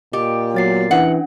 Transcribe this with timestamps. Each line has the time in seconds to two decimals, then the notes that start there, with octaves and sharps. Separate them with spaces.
0.13 A#2 G4 D#5
0.55 F#3 B3 A6 C7
0.91 E3 C#4 D4 F#5